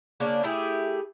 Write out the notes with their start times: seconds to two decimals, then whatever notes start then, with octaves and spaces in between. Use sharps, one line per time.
0.20 C#3 A#3 C#4 D4
0.43 A3 E4 G4 G#4